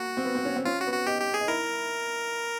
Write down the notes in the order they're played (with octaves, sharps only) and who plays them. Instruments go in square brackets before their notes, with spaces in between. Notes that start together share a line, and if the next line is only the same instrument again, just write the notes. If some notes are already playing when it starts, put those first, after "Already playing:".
Already playing: [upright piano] A#3 [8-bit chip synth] F#4
[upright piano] C4
B3
C4
C#4
C4
[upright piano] C#4 [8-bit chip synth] F4
[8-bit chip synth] F#4
[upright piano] B3
[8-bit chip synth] F#4
[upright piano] D#4 [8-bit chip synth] G4
[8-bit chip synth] G4
G#4
[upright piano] D#4
[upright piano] E4 [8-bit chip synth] A#4